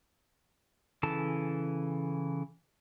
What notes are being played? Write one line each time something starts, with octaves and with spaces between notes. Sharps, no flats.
C#3 E3 A4 A5